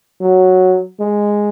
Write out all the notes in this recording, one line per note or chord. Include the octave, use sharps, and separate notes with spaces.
F#3
G#3